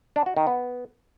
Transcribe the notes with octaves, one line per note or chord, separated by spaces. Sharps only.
D4
F#4
D#3
B3